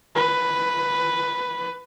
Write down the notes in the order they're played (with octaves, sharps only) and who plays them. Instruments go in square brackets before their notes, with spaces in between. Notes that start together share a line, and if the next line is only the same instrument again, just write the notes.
[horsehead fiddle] B4